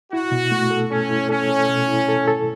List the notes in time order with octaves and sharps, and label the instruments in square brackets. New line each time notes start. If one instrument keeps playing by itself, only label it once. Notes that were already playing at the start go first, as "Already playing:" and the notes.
[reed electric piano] E4 [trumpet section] F#4
[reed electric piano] B2
A3
A4
[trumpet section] C#4 [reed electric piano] A4
[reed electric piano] E4
[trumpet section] C#4 [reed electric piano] A4
[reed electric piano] A4
B2
E4
A4
A4